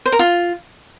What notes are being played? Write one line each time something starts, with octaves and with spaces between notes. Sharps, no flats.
C5
A#4
F4